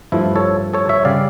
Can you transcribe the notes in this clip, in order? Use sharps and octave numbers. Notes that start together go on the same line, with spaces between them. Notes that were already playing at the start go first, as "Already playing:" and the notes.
G2 F3 A3 E4
A4 C#5
A4 C#5
C#5 E5
C#3 G3 D5 F5